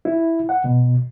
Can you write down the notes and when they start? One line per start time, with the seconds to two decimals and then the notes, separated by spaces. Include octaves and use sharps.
0.05 E4
0.49 F#5
0.64 B2